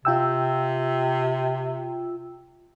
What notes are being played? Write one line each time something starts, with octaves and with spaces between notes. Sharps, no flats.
C3 F4 G5 E6